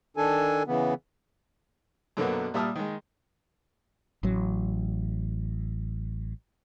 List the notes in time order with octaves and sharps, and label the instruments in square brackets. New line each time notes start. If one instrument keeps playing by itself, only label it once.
[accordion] D#3 D4 A4 G#5
C#3 E3 B3
[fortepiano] F#2 B2 D3 F#3 A#3 B3
A#2 G3 E5 A5 D#6 F6
D#3 G#3
[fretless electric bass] A1 F#3